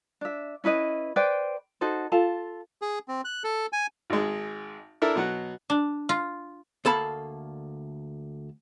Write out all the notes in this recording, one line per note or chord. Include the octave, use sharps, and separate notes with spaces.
D4 E5
C#4 E4 B4 D#5
B4 C5 D5 G5
D#4 F#4 A4 C5
F4 A4 A5
G#4
C4
F#6
A4
G#5
G#1 G#3
D4 E4 A4 A#4 E5
B2 F#3 F#5
D4
F4
D2 A#3 A4 F5 A5 B5